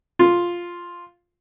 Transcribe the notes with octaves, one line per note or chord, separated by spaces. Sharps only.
F4